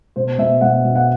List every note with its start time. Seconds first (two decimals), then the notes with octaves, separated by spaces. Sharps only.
0.16 B2 C5
0.38 B2 E5
0.61 B2 F#5
0.85 B2
0.96 F#5